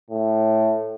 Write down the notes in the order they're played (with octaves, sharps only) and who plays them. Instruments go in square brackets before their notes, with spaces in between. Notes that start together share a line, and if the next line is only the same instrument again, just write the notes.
[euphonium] A2